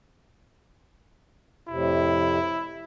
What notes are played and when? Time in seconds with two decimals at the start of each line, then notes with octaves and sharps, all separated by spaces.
1.69 F2 A2 C3 E4